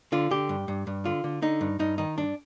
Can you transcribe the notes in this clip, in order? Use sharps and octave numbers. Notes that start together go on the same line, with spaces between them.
D3 F4
D3 G4
G2
G2
G2
D3 F4
D3
D3 D#4
G2
G2 D#4
D#3 D#4
G2 D4